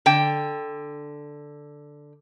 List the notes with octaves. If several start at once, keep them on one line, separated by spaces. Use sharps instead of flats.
D3 G5